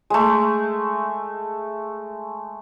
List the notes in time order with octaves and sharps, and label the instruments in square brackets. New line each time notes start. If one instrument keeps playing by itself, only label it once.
[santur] G#3 A3